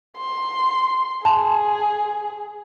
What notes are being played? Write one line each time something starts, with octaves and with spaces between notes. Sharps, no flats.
C6
G#4 A5 C6